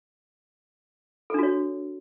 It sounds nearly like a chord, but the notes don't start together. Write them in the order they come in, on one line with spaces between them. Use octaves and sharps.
A4 D4 F#4 C#5